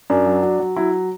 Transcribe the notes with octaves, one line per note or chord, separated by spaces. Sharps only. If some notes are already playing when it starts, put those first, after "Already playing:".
F#2 D4
F#3
F#3
F#3
F#3 E4